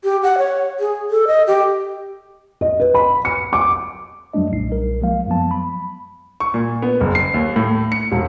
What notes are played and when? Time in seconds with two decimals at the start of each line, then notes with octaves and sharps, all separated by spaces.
0.04 G4
0.23 F#5
0.38 C#5
0.80 G#4
1.11 A4
1.27 D#5
1.47 G4
2.61 D#5
2.80 B4
2.94 B5
3.25 C#7
3.53 D6
4.33 F#2 F#3 G3 A3 D4 D#5
4.51 B1 A#2 F#3 G3 D#4 C7
4.72 B1 A#4
5.01 F3 F#3 G#3 A#3 F5
5.27 F#2 F3 F#3 G#3 B3 A5
5.51 B5
6.40 C#6
6.54 A#2
6.82 B3
7.01 F#1
7.15 C7
7.34 D#2
7.56 A2
7.92 C#7
8.12 E1